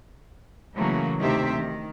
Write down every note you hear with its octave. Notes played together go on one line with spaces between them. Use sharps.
C#3 E3 F#3 A3 A#3
D2 C3 D#3 G4 C5 E5
D#3